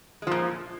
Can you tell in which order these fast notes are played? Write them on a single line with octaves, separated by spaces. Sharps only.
G#3 F3 A#2